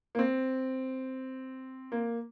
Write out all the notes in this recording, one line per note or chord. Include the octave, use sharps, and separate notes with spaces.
A#3
C4
A#3